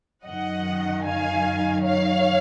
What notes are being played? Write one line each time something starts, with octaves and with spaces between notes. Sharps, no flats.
F#2 D#3 D#5 F#5
F5 G#5
C#5 F5